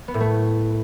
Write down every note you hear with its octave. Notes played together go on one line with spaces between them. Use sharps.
B3
A2
A3